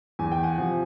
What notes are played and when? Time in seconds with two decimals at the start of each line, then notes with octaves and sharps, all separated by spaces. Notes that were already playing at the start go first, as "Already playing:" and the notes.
0.19 E2 G#5
0.32 G5
0.43 F#5 G#5
0.57 C3 F3